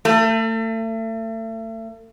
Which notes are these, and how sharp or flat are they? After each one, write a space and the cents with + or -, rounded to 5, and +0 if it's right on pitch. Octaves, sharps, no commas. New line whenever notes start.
A3 +35